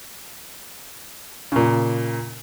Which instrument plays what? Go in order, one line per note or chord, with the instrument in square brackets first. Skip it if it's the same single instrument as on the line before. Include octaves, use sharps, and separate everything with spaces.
[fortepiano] A#2 C#3